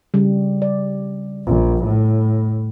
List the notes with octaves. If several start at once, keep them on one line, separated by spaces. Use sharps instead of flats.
C#3 G3
D5
A#1
A2